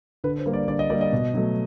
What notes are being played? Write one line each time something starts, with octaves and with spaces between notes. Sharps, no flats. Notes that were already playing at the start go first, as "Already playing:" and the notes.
D3 B4
C5
G3 A#3
D5
D3 D5
D#5
G3 A#3 D5
D#5
B2
F#3 A3